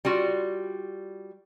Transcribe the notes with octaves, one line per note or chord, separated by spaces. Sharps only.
G3 F4 F#4